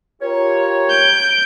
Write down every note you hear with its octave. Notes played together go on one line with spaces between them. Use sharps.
F4 G4 A#4 C#5
G6 D7